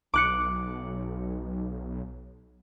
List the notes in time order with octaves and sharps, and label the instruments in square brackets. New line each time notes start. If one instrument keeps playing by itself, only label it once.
[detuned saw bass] B1 [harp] D6 F#6 C#7